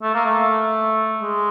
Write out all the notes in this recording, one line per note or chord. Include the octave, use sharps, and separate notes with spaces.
A3
A#3
A3
G#3